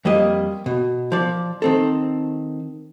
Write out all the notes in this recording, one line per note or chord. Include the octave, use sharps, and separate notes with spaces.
F2 G3 A#3 D#5
B2
F3 D5
D#3 C4 A4